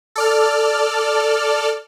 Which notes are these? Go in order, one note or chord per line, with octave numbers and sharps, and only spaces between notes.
A4 D5 F6